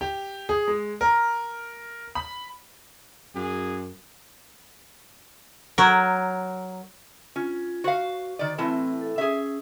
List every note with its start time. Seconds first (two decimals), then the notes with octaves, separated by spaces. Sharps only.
0.01 G4
0.49 G#4
0.68 G#3
1.01 A#4
2.15 B5
3.35 F#2 G#4
5.78 F#3 A#4
7.36 C#4 F4
7.84 F#4 C5 F5
8.39 D#3 D5
8.58 A2 E3 C4 E4 E5 A5
9.01 A4 E5
9.18 C#4 G#4 E5